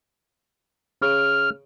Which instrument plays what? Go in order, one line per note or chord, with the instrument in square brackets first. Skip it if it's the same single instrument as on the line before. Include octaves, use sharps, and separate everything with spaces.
[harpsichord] C#3 [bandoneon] F6